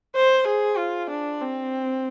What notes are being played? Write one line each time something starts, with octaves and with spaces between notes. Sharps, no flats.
C5
G#4
F4
D4
C4